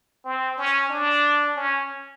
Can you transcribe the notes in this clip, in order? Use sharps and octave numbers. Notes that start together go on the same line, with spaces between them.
C4
C#4
D4
C#4